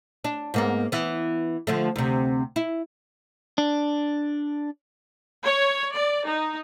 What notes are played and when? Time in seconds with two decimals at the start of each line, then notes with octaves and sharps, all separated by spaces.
0.24 D4
0.54 G#2 A#3 B3
0.92 E3 B3
1.67 D3 F3 A3
1.96 D2 C3
2.56 E4
3.58 D4
5.46 C#5
5.96 D5
6.28 D#4